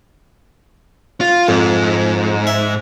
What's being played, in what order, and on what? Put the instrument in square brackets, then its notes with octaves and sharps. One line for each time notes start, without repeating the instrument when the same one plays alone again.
[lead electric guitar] F4
[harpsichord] F2 [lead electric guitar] G#2
[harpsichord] E5